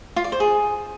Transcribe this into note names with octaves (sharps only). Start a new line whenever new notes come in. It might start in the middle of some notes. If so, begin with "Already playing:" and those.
F4
D5
C5
G#4